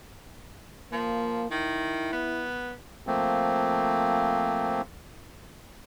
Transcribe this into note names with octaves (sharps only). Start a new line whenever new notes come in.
F3 A#3
D#3 E4
B3
F3 A3 A#3 C4